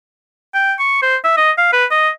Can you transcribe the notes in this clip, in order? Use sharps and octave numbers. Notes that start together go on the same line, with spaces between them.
G5
C#6
C5
E5
D#5
F5
B4
D#5